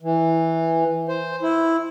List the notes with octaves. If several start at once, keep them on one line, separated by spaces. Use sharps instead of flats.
E3
C5
E4